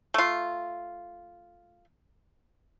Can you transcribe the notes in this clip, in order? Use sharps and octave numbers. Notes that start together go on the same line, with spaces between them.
A3 F4